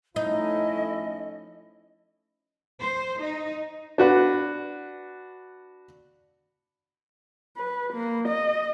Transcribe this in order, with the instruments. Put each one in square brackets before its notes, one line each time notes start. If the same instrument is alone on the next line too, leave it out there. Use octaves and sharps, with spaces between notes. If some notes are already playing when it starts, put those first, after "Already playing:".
[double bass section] F3 A3 C#4 [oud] D#4 [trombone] E4 [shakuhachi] D#5
[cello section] C5
D#4
[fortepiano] D4 F#4 B4
[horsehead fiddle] B4
A#3
D#5